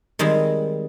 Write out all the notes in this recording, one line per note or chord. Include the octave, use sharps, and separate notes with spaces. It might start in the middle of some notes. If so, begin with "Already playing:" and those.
D#3 G3 G#3 C4